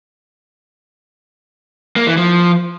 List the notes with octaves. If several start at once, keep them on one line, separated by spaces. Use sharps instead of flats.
A#3
E3
F3